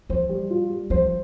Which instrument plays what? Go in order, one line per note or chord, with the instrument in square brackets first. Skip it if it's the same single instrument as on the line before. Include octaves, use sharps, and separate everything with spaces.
[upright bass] F3 [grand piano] C5
[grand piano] G3
F4
G3
[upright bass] F3 [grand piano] C5